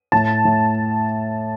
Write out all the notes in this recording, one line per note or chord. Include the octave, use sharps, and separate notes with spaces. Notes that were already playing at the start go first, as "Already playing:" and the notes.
A2 A5
A2